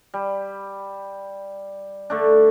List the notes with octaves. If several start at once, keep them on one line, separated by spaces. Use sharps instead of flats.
G3
D3 A3 D4